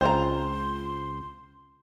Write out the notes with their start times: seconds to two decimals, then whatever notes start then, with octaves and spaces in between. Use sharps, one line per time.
0.01 C#2 C4 F4 C5 A#5 C6